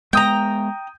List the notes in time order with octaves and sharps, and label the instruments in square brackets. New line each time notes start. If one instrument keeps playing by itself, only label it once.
[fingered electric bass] G#3 B3 [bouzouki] G5 A#5 [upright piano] D#6 G6